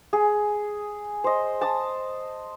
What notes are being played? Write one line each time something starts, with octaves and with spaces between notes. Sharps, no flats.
G#4
C5 D#5
A5 D#6